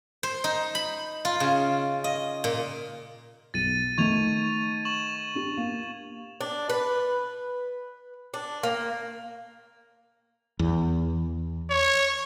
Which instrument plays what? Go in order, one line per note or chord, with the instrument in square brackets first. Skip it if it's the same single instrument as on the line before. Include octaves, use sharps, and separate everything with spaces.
[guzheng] C5
D#4
B5
F4
C#3
D#5
A#2
[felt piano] B1 [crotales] A6 D#7
[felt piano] D#3 A3 [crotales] C#6 G#6 F7
[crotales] C#6 E7 F#7
[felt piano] D4 G4
A#3
[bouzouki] D4
B4
D4
A#3
[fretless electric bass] E2
[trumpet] C#5